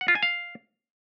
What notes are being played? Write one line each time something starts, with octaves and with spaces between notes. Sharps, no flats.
F#5
F4
G#5
F5